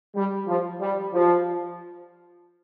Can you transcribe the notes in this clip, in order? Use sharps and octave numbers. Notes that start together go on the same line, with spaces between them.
G3
F3
G3
F3